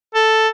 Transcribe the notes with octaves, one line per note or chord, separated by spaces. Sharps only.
A4